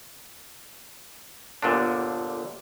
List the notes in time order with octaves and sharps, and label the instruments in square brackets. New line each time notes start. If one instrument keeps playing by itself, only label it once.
[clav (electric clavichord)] G1 A#2 D3 D4